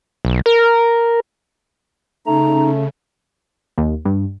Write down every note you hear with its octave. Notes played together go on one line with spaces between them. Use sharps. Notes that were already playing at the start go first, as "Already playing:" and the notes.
B1
A#4
C#3 A3 D#4 A#5
D#2
G2